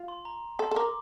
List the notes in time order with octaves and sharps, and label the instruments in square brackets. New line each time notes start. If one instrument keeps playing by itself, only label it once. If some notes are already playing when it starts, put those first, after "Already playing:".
Already playing: [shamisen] F4
[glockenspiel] C6
A#5
[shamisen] A4 [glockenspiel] C6
[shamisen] A4 [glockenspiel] C6
[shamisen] A#4 [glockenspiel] D6